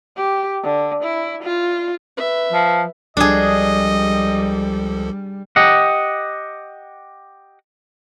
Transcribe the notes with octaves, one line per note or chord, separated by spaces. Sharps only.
G4
D3
E4
F4
B4 E5
F3
C#2 F3 G3 D4 G#4 A4 D#5
G4 D#5 F#5